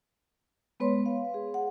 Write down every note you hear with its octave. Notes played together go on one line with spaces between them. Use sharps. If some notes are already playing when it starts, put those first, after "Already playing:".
G#3 B3 B4 C#5 C6
F5
G#4
F#5